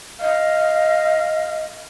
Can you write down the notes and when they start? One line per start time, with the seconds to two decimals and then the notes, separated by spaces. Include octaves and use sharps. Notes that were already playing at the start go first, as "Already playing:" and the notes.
0.21 D#5 F5